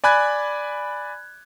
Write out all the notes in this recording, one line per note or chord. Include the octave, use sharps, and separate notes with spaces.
D5 G#5 B5 F#6 G#6